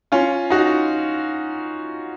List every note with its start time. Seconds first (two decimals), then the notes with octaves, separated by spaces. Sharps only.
0.12 C#4 F4
0.50 D#4 F#4